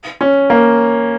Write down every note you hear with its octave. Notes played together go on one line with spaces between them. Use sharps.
C#4
A#3